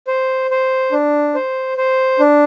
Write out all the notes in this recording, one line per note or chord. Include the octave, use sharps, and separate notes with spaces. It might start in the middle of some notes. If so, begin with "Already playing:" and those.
C5
C5
D4
C5
C5
D4